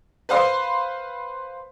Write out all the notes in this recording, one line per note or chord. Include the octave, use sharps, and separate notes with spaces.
B4 C5 F5 C6